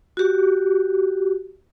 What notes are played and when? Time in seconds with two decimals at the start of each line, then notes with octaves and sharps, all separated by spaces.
0.17 F#4 G4